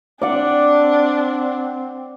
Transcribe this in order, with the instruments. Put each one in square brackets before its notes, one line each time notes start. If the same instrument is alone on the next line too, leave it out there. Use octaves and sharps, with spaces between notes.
[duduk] C4 [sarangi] D4 [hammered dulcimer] D5 F#5